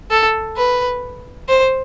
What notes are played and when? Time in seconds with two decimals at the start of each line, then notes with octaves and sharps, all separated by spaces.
0.11 A4
0.57 B4
1.49 C5